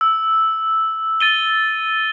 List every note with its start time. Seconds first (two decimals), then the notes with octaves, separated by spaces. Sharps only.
0.01 E6
1.20 A6 D#7 G7